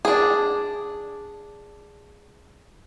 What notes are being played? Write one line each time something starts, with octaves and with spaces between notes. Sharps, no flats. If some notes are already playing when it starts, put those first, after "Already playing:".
D4 G#4